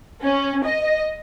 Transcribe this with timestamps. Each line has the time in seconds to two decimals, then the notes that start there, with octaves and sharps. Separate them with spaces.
0.23 C#4
0.65 D#5